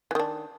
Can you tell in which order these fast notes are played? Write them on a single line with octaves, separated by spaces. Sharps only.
E3 D#3 D4